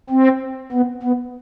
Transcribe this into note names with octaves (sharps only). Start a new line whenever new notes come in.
C4
B3
B3